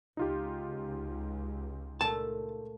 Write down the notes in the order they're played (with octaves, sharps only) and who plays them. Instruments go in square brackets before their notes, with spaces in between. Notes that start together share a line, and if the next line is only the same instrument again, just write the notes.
[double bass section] C#2 [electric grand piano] D#4 F4 G4
[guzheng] A#2 A3 [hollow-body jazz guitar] A5